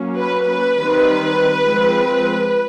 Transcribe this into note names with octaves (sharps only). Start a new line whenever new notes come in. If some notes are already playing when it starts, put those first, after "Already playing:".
Already playing: F#3 A#3 C#4
B4
B4
D#3 G3 C4
F3 G#3 C4